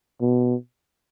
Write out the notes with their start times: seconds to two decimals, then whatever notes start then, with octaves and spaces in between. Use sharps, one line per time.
0.21 B2